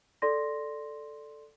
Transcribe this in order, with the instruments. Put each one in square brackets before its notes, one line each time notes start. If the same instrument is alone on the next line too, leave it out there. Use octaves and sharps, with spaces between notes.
[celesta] A4 D5 C6 A#6